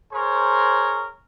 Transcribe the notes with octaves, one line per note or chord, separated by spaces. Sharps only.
G#4 A#4 C5 C#5